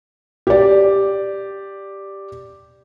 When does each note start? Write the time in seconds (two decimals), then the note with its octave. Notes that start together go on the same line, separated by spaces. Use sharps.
0.47 G4 D5